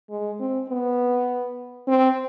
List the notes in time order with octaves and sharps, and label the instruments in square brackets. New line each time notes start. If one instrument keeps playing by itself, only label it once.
[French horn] G#3
C4
B3
C4